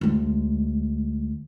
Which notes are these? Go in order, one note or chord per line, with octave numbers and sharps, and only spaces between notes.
D2 G#3